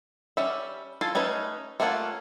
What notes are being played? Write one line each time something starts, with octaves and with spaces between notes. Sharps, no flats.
G3 C#4 E5
F4 A4 G#5
A3 C#4 D#4 B4
A3 A#3 C#4 F4 F#5